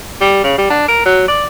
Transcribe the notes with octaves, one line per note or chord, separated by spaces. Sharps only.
G3
C#3
G3
D4
A#4
F#3
D5